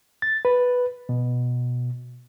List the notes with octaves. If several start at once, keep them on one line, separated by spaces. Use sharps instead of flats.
A6
B4
B2